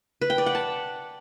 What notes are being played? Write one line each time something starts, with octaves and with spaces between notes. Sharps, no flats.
B4
G5
D5
F#5
A5